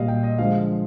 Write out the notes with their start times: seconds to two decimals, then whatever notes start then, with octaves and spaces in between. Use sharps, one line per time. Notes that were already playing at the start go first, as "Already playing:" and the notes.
Already playing: A#2 G3 D#5 F5
0.08 G5
0.23 D#5
0.38 D3 F3 G#3 F5
0.58 F5